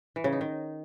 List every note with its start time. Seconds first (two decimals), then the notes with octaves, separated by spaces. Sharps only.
0.16 E3
0.24 C#3
0.33 D#4
0.41 D#3